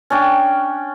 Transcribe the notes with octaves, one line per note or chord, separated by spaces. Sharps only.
C#4 D4 G5